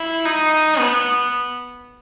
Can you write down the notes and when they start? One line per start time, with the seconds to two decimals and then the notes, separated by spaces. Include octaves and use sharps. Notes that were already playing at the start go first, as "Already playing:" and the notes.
Already playing: E4
0.25 D#4
0.78 B3